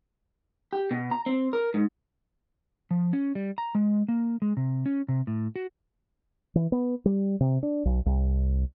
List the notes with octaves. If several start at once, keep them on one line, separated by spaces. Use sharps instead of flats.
G4
B2
A#5
C4
A#4
G#2
F3
C#4
G3
A#5
G#3
A#3
G#3
C3
C#4
C3
A2
F#4
E3
B3
G3
C3
D4
B1
C2